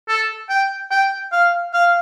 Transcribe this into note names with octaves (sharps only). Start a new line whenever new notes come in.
A4
G5
G5
F5
F5